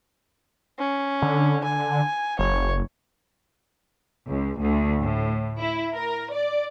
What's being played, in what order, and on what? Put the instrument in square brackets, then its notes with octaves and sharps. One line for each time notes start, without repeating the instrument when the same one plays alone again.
[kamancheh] C#4
[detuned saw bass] D3
[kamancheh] G#5
[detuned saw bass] F#1 [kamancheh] C#5
[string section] C#2
D2
A2
E4
A#4
D5